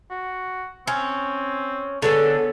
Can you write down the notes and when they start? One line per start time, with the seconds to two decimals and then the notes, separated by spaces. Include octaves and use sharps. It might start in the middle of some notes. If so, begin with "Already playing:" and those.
0.10 F#4
0.87 C4 C#4
2.02 D3 B3 D4 G#4 A4 C#5